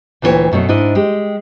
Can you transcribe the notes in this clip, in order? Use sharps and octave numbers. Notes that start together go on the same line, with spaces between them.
D2 A#2 E3 E4 C#5 G5
F#2 B2 A3 C#5
G#2 D4 E4 D#5
G#3 G4